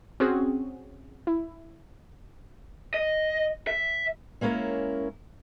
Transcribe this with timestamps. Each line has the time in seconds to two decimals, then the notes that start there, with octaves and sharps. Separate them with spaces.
0.20 C4 C#4 F#4 G#4
1.27 E4
2.94 D#5
3.67 E5
4.41 G#3 A#3 C#4 E4 A#4 C#5